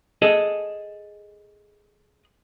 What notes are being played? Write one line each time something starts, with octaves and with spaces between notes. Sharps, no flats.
G#4 A4 D#5